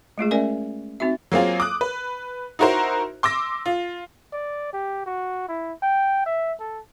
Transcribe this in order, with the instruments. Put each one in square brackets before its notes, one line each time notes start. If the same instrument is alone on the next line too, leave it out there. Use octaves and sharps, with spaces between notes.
[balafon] G#3 A3 F4 G#4
C#4 A#4 D5 E5 G#5
C4 D#4 F#4 E5
[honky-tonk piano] F#3 A#3 C4 F4 G#4
D6 D#6 F#6
B4
D#4 E4 F#4 A#4 C5
C6 D6 E6 A#6
F4
[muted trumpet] D5
G4
F#4
E4
G5
E5
A4